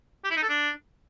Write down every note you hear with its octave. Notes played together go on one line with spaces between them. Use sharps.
G4
E4
D#4
A4
D4